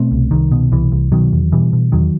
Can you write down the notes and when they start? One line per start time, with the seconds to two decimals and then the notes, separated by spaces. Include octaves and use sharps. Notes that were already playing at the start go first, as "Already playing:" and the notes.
Already playing: B2 A3 C4
0.11 C2
0.31 C2 D#3
0.52 B2
0.72 C2 E3
0.92 C2
1.12 B2 D#3 F#3
1.33 E2
1.52 B2 E3 G3
1.73 B2
1.92 E2 D#3 F#3